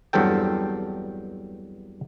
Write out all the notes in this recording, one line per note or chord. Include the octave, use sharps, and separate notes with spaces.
E2 G2 F#3 C4 A4 G5